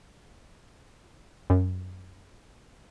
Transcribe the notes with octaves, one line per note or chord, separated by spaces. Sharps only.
F#2